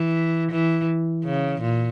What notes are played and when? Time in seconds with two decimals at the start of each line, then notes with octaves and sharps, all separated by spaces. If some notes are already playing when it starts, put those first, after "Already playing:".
Already playing: E3
0.51 E3
1.25 C#3
1.61 A#2